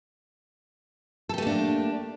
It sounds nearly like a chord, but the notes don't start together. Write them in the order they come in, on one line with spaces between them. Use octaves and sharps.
A4 G4 A3 A#3 D4